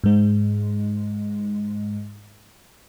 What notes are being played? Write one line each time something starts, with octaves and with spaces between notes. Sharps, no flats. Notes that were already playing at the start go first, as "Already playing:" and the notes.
G#2 G#3